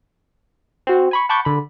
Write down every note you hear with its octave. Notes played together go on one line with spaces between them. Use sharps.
C4 F#4
G#5 B5 C#6
F#5 A5 B5 C#6 D6 G6
D3 B5